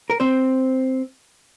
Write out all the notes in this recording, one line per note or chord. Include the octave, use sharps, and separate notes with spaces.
A#4
C4 C5